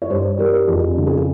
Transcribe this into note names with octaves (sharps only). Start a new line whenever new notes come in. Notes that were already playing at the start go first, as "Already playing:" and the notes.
C#5
G2 C5
G3 A#4
F2 G#4
C#3
G#4